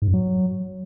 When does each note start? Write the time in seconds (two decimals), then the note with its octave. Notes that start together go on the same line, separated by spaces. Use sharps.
0.02 G#2
0.08 F#2
0.14 F#3